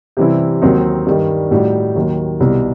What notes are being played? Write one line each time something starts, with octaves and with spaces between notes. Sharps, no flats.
C3 E3 G3 C4 E4
D#2 D#3 F#3 C4 D#4
G2 D#3 G3
A2 G3 D#4 F#4
D#2 D#3 F#3
C2 B2 G3